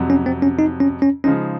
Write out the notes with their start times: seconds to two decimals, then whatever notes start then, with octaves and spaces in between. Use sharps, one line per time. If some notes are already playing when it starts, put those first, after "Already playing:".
Already playing: F2 C3 F#3
0.10 C#4
0.26 C4
0.42 C#4
0.59 D#4
0.80 C#4
1.02 C#4
1.24 C#3 F3 G#3 C#4 D#4